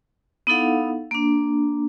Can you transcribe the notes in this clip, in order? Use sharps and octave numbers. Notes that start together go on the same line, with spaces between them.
B3 D#4 E4 A4 F5 F#5
A#3 D4